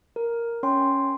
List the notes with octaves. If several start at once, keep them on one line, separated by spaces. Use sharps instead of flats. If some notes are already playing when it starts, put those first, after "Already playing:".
A#4
C#4 C#5 G5 C6